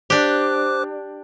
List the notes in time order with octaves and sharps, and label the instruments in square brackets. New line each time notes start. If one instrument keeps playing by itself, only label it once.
[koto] D4 G4 [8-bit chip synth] C5 D6 F#6